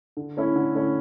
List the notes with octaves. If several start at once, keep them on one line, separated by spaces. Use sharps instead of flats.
D3
A3 C#4 E4
D3
A3 C#4 E4